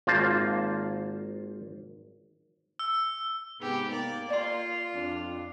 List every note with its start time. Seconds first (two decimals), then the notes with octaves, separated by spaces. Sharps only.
0.07 G#1 A#3 F4 C5 A5
2.79 E6
3.60 G#2 C3 B3 G4
3.91 A#3 D5
4.30 F4 D5 C6
4.94 F2 D4